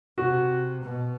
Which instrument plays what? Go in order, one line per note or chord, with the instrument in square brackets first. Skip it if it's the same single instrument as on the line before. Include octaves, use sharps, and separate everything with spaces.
[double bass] C3 [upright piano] F#4
[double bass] B2